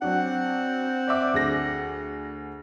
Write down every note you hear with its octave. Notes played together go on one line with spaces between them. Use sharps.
F#3 C4 D4 F#5
D5 E5 D6
D2 G#4 A#6